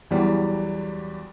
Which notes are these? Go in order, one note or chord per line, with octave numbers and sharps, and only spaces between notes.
E2 E3 F#3 G3